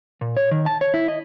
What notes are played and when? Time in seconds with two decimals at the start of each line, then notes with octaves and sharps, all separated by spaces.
0.21 A#2
0.37 C#5
0.51 D#3
0.66 A5
0.81 C#5
0.94 E4
1.08 D#5